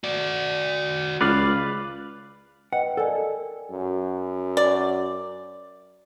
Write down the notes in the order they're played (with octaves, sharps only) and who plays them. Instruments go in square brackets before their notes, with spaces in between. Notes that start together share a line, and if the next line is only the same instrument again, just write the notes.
[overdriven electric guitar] F#4 D5
[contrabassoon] C#2 [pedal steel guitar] B4 D5 F5
[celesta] B4 D#5 G5 [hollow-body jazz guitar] F#5
[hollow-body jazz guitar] A4 [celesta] A#4 D5 G#5
[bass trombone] F#2
[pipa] D5